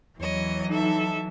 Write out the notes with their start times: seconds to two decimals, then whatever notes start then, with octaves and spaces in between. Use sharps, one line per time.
0.19 E2 E3 F#3 C#5 D#5
0.70 D#4 A4 E5